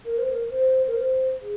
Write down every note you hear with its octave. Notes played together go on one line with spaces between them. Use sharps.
A#4
C5
A#4
C5
A#4
C5
G#4